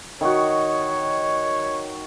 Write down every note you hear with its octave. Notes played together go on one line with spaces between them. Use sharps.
D#3 F#4 C#5